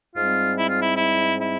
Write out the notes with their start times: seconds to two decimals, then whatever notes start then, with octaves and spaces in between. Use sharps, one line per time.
0.14 G#2 G3 C4 F4
0.56 E4
0.69 F4
0.81 E4
0.96 E4
1.38 E4